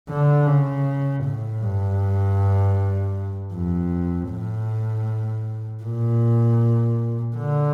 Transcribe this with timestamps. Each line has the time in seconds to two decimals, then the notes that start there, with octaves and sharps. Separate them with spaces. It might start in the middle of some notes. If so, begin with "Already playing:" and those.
0.10 D3
0.47 C#3
1.24 A2
1.62 G2
3.54 F2
4.30 A2
5.83 A#2
7.36 D3